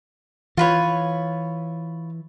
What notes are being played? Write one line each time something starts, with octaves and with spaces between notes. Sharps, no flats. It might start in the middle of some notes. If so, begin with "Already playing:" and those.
E3 F4 B4 C#5